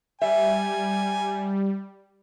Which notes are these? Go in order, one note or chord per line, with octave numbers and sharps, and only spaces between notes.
G3 E5 G#5